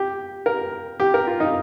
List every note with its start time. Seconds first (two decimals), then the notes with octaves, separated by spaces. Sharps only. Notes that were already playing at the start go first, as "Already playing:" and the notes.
Already playing: G4
0.46 A#4
1.00 G4
1.14 A#4
1.27 F4
1.40 D#4